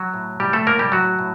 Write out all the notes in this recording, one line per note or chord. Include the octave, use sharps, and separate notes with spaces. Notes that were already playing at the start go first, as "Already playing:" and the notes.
Already playing: F#3 F#4
A2
A2 G3 G4
A3 A4
A2 A#3 A#4
G3 G4
A2 F#3 F#4
A2